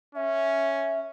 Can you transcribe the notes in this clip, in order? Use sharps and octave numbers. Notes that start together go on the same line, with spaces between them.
C#4 E5